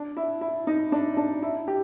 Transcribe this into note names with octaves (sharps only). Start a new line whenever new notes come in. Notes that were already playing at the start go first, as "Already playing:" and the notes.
Already playing: D4
E4
E4
D#4
D4
D4
E4
G4